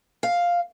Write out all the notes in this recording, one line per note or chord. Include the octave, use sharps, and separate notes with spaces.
F5